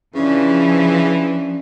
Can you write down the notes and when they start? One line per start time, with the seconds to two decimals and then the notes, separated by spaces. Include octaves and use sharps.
0.15 C#3 E3 F3 C#4 D4 D5